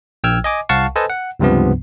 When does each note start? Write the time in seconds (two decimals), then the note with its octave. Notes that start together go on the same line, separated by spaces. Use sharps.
0.24 A#1 G5 E6 F6 G#6
0.44 D#5 G#5 D6
0.69 C2 F5 F#5 A5 C#6
0.96 A4 B4 C5 D#5 G#5 A5
1.10 F#5
1.40 C#2 G2 C3 F3 B3